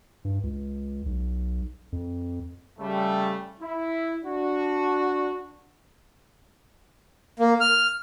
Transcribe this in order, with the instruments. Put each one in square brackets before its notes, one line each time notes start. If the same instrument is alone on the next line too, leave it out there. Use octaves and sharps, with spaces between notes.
[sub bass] G2
C#2
B1
F2
[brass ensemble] C#3 G3 A3
E4
D4 F#4
[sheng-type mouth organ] A#3
F6